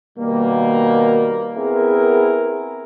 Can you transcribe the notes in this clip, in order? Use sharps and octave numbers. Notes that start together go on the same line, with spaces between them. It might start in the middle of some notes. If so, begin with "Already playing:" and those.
B2 D#3 G3 A#3
B3 C4 E4 G#4 A#4